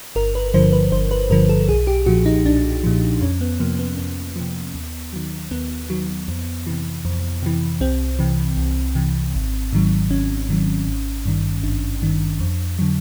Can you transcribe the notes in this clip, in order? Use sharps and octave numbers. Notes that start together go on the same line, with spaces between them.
G1 A#4
B4
G2 D3 F3 C5
B4
G1 C5
B4
G2 D3 F3 A#4
A4
B1 G#4
G4
A#2 F3 F#4
D#4
B1 D4
A#2 F3
F2 C#4
B3
C3 F3 A#3
B3
F2 B3
C3 F3
D#2
D#3 F#3
D#2 B3
D#3 F#3
F2
C3 E3
F2
C3 E3
C2 C4
C3 E3
C2
C3 E3
G#1
G#2 D#3 F#3
G#1 C#4
G#2 D#3 F#3
G#1
G2 D#3
G#1 D4
G2 D#3
F2
D3 F#3